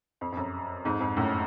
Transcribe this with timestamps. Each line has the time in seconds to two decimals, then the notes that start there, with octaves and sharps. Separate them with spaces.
0.21 F2
0.32 F2
0.37 F#2
0.85 F2 G#2
1.00 F2 G#2
1.17 F#2 A2